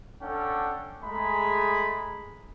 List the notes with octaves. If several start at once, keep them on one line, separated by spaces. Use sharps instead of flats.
C#4 D4 A4 F#5 G5
G#3 A3 G#4 A#5 B5